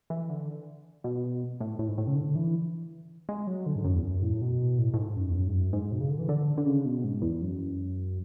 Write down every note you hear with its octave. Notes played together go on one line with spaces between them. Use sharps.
E3
D3
B2
A2
A2
G#2
A2
C#3
D3
E3
G#3
F#3
D3
G#2
F#2
E2
F#2
A2
B2
A2
A2
G#2
F#2
E2
F#2
G#2
F#2
G#2
B2
C#3
D3
E3
D3
D3
C#3
B2
G#2
E2
F#2